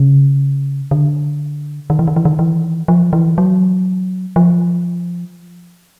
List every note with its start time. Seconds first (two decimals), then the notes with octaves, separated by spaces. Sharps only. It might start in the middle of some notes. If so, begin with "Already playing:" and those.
Already playing: C#3
0.91 D3
1.90 D#3
1.99 E3
2.07 D#3
2.16 E3
2.25 D#3
2.39 E3
2.88 F3
3.13 E3
3.38 F#3
4.36 F3